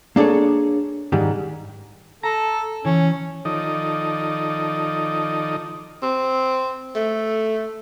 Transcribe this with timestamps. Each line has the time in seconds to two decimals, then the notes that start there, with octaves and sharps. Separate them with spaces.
0.16 A#3 D4 G#4 A4 C#5
1.12 G#2 D#3 G3 G#3
2.23 A4 A#5
2.85 E3 C#4
3.45 D#3 F3 D#4 A4 D5 D#5
6.03 C4
6.95 A3